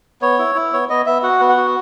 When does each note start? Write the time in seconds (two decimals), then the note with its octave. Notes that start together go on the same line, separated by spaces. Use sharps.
0.22 B3 C#5
0.39 E4
0.55 E4
0.72 B3 C#5
0.90 B3 D#5
1.06 B3 E5
1.23 F#4 F#5
1.40 B3
1.49 F#5
1.57 F#4